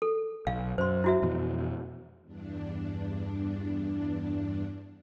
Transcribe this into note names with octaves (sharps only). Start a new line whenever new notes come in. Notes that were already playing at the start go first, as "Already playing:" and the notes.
A4
B1 F5
F#2 C5 C6
E4 F#4 E5
F2 B2 E3
E2 G2 D4